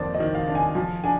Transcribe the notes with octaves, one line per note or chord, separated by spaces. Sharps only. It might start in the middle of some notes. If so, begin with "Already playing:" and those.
Already playing: F2 D#3 A#3 D4 C5 D5
D#5
D#3
F5
D4
G#5
F3
D4 G#5